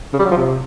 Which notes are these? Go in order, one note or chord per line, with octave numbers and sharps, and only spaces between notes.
C#3
G3
F#3
F3
C3